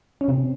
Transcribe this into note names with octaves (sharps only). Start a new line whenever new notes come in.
C#4
C3 C4